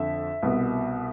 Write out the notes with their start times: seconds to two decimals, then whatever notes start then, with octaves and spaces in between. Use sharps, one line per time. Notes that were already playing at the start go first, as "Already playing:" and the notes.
Already playing: F2 D3 E5
0.43 C2 B2